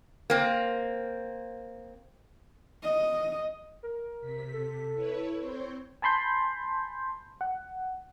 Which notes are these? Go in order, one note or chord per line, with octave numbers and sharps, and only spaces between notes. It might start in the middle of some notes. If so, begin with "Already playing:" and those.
A#3 C4
D#5
A#4
C3 B6
A4
E4 B4 C#5
C4 C5 C#5
G#5 A5 B5 C6 G6
F#5